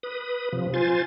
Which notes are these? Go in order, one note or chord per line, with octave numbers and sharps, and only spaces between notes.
B4 D#6
C3 F3
F4 C5 G#5 A6